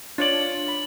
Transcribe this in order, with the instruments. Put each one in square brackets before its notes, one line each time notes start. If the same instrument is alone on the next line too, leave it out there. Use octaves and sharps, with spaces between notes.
[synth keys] D4 [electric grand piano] F4 C#5 D5 [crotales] A6 F#7
[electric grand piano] B5